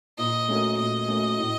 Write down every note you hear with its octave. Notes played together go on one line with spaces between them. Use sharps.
A#2 D#5
A3 C#4 F#4 A#4
A#2 D#5
A3 C#4 F#4 A#4
A2